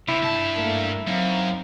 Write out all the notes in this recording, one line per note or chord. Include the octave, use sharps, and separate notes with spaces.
C3 E4
G2 A5
A3 A#3 A#4
F#2 C4 D#4 F5